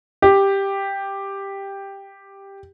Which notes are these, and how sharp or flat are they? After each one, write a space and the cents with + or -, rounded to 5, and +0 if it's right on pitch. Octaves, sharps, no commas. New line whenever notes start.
G4 +5